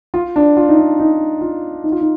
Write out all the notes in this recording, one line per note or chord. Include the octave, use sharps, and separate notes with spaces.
F4
D4
F4
D#4
D4
D#4
F4
D#4
F4
D#4